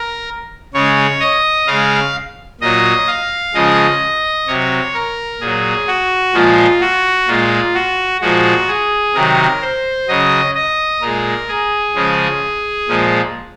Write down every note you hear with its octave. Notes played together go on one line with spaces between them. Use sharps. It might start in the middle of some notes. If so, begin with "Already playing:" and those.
Already playing: A#4
C#3 G#3 C#5
D#5
C#3 G#3 F5
A#2 F#3 D#5
F5
C#3 F3 G#3 D#5
C3 F#3 C#5
A#4
A#2 F#3 G#4
F#4
A#2 F3 G#3 F4
F#4
A#2 G#3 F4
F#4
A#2 F3 G#3 F#4
G#4
C3 D#3 F#3 A#4
C5
C#3 F#3 D#5
D#5
A#2 G#3 A#4
G#4
C#3 F3 G#3
A#2 F3 G#3